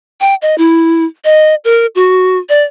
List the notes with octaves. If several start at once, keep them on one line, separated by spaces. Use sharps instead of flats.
G5
D#5
E4
D#5
A#4
F#4
D5